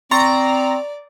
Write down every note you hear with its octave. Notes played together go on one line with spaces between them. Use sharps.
C4 D5 A#5 C6 C#6 A6